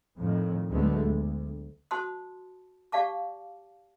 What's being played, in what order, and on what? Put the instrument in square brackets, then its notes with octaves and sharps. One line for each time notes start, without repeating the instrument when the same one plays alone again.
[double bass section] F2 A2 D#3
D2 D3 F#3 G#3 A3 B3
D2
[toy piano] F#4 C5 A5 C6 D#6
G4 D5 F5 A5 D6